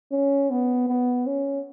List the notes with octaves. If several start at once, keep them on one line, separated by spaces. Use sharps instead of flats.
C#4
B3
B3
C#4